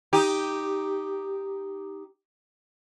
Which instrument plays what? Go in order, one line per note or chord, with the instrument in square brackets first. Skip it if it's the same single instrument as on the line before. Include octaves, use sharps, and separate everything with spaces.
[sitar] D#4 G4